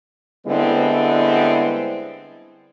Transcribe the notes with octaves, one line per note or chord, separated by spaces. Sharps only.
D3 G3 G#3 B3 C4 E4